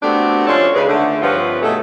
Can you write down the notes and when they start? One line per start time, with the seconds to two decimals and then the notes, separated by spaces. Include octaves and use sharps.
0.02 A3 B3 C4 D4 F#4 G4
0.47 F3 G#3 C#4 A4 C#5 D5
0.74 C#3 D#4 G#4 A#4 B4
0.87 D3 A3
1.21 G2 F3 C4 F4 B4 C#5
1.61 B2 A3 D#4 G#4 A4